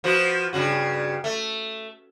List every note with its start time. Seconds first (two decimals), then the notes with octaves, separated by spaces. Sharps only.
0.04 F3 B3 F#4
0.53 G2 C#3 F#4
1.24 A3